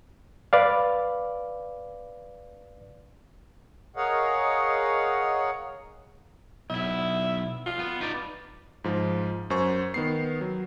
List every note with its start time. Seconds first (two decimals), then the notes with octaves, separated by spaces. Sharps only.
0.53 B4 D5 F5
3.96 G#4 A#4 C#5 D#5 F5 F#5
6.70 B1 E4 E5
7.66 F4
7.79 B3
8.01 D#4 B4 D5
8.84 G#2 F3
9.50 F#2 C5 C#6
9.94 D#3 B3 C7
10.41 F#3